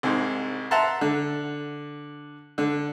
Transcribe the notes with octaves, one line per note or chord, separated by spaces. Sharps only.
C2 G#2
E5 F#5 A5 A#5 C6
D3
D3